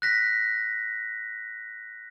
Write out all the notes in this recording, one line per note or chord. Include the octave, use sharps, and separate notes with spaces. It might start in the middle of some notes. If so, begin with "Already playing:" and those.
F#6 A#6 B6